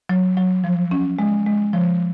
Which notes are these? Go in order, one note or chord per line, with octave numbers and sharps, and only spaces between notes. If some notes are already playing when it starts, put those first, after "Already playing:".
F#3
F#3
F3
C#4
G#3
G#3
F3